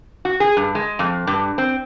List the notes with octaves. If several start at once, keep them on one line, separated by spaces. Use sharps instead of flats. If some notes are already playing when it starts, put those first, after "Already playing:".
F#4
G#4
G2
G#3
F2
G2
C4